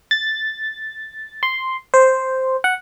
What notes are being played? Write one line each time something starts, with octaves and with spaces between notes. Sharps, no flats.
A6
C6
C5
F#5